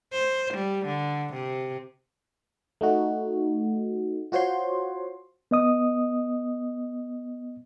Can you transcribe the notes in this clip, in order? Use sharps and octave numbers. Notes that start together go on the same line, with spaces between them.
C5
G3
D3
C3
A3 D#4 F#4
F4 F#4 C5 C#5 C6
B3 D#5 D#6